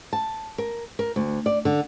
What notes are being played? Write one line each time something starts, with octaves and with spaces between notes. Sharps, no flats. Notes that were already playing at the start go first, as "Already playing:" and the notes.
A5
A#4
A#4
D2
D5
D3